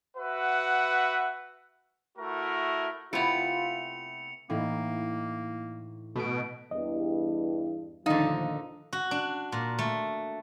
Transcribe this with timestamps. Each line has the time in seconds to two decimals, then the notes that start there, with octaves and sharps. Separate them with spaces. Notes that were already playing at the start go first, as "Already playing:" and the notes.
0.17 F#4 B4 E5 F#5
2.18 A3 E4 F#4 A#4
3.13 C3 A3 B3 E4 F4 C#7 F7
4.50 A2 E3 A#3 D#4 E4
6.16 B2 A3 D7
6.71 E2 G2 D#5
8.06 D2 A#2 D3 D#3 F3 D#4 D#5 F5
8.93 F#4
9.11 D4
9.52 A#2
9.79 A3